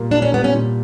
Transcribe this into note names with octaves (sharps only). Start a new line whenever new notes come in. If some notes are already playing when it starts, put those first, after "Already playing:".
Already playing: A#2 G3 A#3
D4 E4
C#4
G3 B3
C#4
A#2